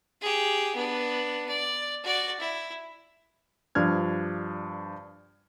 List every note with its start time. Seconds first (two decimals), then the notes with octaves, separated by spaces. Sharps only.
0.21 G4 G#4
0.75 B3 D4
1.49 D5
2.03 F#4 D5
2.40 E4
3.75 G2 F3 D4 F6 G#6